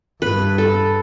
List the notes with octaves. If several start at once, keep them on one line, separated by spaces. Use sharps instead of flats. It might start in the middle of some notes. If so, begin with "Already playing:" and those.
G2 B4
A4